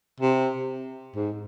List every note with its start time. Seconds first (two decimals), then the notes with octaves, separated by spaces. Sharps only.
0.20 C3
1.15 G#2